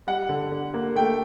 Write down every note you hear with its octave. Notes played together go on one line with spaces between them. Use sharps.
G3 F#5
D3
D3
A#3
A3 G5